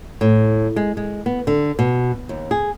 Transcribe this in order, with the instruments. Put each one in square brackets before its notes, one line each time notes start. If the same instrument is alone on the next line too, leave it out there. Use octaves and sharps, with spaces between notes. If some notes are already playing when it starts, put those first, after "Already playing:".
[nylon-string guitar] A2
G#3
G#3
B3
D3
B2
D#2
G#4